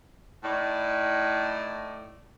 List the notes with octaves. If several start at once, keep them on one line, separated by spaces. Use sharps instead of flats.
A2 D#4 D5